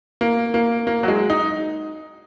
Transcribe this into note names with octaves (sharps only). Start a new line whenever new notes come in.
A#3
A#3
A#3
F#3
G#3
D#4